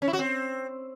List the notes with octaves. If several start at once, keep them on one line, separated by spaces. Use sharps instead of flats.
C#4
E4
F#4
C4